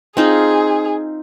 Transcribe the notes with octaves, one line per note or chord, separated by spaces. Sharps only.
C4 D#4 F4 G#4